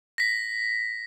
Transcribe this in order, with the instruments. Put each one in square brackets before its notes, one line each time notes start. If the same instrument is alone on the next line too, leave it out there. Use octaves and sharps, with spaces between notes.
[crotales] A#6 B6